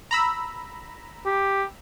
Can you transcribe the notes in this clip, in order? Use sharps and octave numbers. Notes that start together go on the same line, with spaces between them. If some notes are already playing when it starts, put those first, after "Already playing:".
A#5 B5 E6
G4